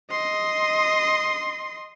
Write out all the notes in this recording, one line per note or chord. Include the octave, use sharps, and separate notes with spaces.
D#5 C6